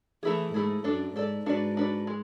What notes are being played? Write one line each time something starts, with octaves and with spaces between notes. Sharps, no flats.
E3 A3 E4 G#4
G#2 A3 E4 G#4
F#2 D4 A4 D5
G#2 D4 A4 D5
G#2 D4 F#4 B4 D5
D4 F#4 B4 D5
G#3